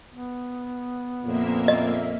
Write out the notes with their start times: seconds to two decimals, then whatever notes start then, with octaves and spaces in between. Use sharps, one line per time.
0.10 B3
1.24 F2 A#2 A#3 E5
1.68 D#5